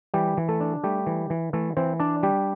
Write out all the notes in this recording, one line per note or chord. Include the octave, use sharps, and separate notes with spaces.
E3 G3 G4
E3
A3 A4
D4
G3 A3 G4
E3
E3
E3 A3 A4
E3 C4 C5
D4 D5
G3 G4